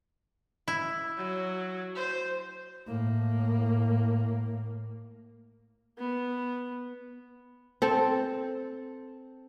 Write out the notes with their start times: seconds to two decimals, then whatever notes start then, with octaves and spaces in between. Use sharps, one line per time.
0.68 E4
1.18 F#3
1.96 C5
2.87 A2 A#3
5.99 B3
7.82 C4 A4